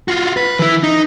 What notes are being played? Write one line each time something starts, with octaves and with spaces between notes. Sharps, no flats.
F4 F#4
B4
E3 E4
D#4